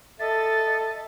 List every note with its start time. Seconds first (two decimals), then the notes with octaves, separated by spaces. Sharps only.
0.20 A4 D#5 E5 A6